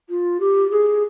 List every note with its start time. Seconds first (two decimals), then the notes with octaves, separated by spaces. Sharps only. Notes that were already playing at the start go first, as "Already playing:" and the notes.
0.09 F4
0.40 G4
0.70 G#4